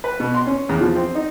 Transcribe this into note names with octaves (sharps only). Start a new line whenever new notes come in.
B4
B2
C6
C#4
E2
F3
C4
D#4